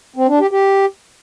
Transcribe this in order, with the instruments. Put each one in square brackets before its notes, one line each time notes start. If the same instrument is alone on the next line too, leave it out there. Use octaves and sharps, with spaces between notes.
[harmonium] C4
D4
G4
G4